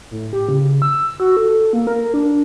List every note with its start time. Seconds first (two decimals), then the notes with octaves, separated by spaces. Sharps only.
0.11 A2
0.33 G4
0.49 C#3
0.82 E6
1.20 F#4
1.37 A4
1.73 A#3
1.87 A#4
2.14 D4